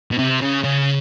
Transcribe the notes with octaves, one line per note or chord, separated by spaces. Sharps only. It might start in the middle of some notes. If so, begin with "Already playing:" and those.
B2
C3
C#3
C#3